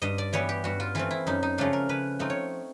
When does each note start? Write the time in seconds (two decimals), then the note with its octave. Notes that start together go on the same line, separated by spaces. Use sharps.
0.02 G2 D#5
0.18 D5
0.33 E3 G3 B3 C#5
0.49 G4
0.64 G2 F#4
0.80 F4
0.95 E3 A3 C4 F4
1.11 E4
1.27 F#2 D#4
1.43 D#4
1.58 C#3 F3 A3 D4 A4
1.73 A#4
1.89 C#3 B4
2.19 F3 A3 C4 D#4
2.30 C#5